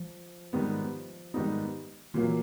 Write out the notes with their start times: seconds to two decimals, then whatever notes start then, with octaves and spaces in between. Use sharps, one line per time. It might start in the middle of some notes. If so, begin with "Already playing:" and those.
Already playing: F3
0.53 G#2 D#3 G3 B3 D#4
1.34 G#2 D#3 G3 B3 D#4
2.14 A#2 D#3 F#3 A#3
2.24 E3